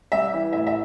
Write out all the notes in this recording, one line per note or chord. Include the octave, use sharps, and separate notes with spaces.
G3 E5
E3
A2 E5
E5